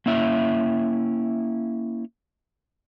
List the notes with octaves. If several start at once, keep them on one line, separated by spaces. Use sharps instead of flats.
A#3 C#4 E4 E5